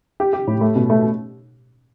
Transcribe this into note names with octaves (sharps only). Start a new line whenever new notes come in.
G4
G4
A2
A3
B2
A3